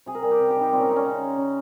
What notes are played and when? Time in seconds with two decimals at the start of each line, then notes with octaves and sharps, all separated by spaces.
0.06 C3 G#4
0.15 A#4
0.23 G3 G#4
0.31 G4
0.39 C3
0.50 G4
0.56 D#3 G3 D#4
0.72 A#2 C4
0.80 C#4
0.89 G#3 D#4
0.96 C#4
1.05 C#3
1.21 G#3
1.37 C#3